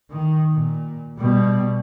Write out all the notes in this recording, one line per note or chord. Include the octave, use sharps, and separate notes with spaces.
D#3
A#2
B2 G3